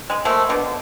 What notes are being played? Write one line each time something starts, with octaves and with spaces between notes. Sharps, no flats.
G#3
F3 A3 A#3
B2 D3